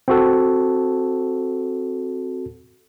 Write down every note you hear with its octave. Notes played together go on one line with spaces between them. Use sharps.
C4 F#4 A4